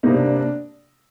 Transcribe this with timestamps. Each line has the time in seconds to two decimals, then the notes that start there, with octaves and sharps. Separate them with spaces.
0.03 C3 G3 A#3 D#4
0.15 D4
0.25 D4
0.37 D4